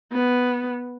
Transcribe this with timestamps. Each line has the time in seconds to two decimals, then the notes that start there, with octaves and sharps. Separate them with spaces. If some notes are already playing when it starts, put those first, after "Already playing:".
0.13 B3